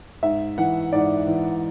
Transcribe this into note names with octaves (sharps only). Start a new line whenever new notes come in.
G#2 E5
E3 F#5
G#2 D5
E3